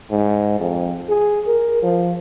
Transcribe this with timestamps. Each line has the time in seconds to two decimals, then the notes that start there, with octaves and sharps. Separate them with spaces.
0.11 G#2
0.60 F2
1.08 G#4
1.47 A#4
1.83 F3